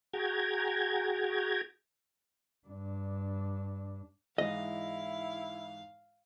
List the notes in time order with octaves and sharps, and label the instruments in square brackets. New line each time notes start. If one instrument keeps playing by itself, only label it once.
[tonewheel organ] F#4 G#4 G5 A#5 G#6
[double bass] G2 D4
[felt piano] G#2 E3 [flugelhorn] E4 [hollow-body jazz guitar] D#5 [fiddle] F5